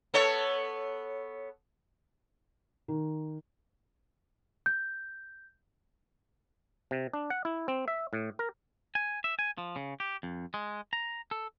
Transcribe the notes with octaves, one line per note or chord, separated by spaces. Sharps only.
B3 A4 C#5
D#3
G6
C3
D4
F#5
E4
C4
E5
A2
A#4
G#5
E5
G#5
F3
C#3
G4
F2
G#3
A#5
A4